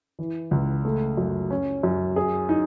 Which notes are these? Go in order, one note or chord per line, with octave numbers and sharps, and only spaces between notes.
E3
C#2
A3
F#2
C#4
F#2
G#4
D#4